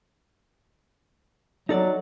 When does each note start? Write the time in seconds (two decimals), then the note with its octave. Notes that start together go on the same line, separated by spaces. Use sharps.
1.69 F#3 D#4 A4 D5